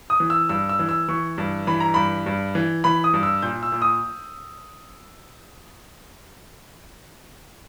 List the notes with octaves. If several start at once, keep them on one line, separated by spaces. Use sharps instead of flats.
D#6
E3
E6
G2 E6
E6
E3
E6
E3 C#6
G2
E3 B5
A#5
G2 B5
G2
E3
E3 B5
D#6
G2
E6
A#2 G6
E6
A#2
D#6